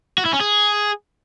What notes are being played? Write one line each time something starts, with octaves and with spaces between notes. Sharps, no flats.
F#4
E4
C#4
G#4